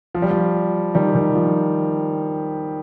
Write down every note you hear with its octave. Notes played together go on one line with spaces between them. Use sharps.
F3
G3
F3
D#3 G3
D#3
F3